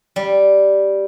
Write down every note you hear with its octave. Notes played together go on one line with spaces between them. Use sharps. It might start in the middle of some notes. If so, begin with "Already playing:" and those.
G3